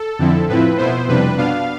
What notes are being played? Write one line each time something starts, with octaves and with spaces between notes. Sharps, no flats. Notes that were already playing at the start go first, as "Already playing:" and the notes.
Already playing: A4
F2 D3 F3 C4 E4
A2 F3 C4 E4 B4
B2 B3 E4 C5
F2 C3 G3 D4 B4
B2 B3 D4 F5